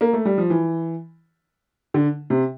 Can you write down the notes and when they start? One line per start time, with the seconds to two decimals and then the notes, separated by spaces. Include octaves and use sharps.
0.01 A#3
0.13 A3
0.25 G3
0.38 F3
0.50 E3
1.94 D3
2.30 C3